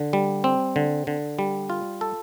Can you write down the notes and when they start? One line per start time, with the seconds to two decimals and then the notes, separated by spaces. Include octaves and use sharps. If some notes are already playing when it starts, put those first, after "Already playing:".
Already playing: D3
0.13 G3
0.44 C4
0.76 D3
1.07 D3
1.39 G3
1.70 F4
2.01 A4